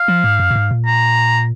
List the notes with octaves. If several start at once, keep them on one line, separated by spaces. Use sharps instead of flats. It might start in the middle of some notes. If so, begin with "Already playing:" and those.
Already playing: F5
F3
G#2
F#2
A#2
G#2
A#2
A#5